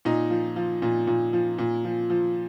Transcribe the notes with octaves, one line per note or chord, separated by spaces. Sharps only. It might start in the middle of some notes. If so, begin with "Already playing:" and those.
A#2 D#4
F3
F3
A#2
A#2
F3
A#2
F3
F3